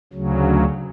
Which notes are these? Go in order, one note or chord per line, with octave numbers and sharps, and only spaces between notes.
D2 C#3 F#3